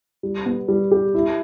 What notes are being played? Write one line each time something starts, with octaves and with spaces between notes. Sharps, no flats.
G3
B3
G3
G4
E4